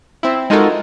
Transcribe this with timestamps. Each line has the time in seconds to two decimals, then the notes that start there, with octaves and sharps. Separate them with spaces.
0.23 C4 E4
0.50 G#3 D#4 F4 F#4 A4 A#4